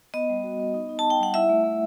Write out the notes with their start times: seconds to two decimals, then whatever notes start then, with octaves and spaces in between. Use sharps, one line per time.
0.14 B3 D#5
0.29 G3
0.44 F#4
0.60 B3
0.74 D#4
0.89 D#4
0.99 A5
1.05 D#4
1.10 G5
1.20 G3 F#5
1.34 E4 E5
1.49 A3
1.64 A3